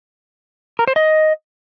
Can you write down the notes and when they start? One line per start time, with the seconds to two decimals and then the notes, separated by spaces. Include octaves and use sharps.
0.79 A#4
0.88 C5
0.96 D#5